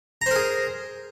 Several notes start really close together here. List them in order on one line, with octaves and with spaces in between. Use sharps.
A#5 C5 A#4 G#4